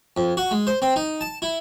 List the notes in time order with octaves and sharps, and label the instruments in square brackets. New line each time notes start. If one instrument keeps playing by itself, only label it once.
[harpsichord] F2
F#4
G#3
C5
C4
D#4
A5
E4